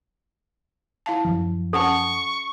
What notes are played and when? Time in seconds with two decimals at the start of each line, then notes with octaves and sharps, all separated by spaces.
1.06 E4 F5 A5
1.25 F#2 F3
1.73 C#4 A4 F#5 A5 C#6